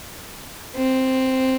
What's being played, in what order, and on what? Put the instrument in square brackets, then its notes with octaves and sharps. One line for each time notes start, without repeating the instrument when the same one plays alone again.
[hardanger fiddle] C4